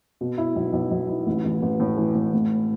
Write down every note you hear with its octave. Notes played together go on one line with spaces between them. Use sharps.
B2
E4
B1
B1
B1
E4
A1
A1
A1
A2
E3
A2
A2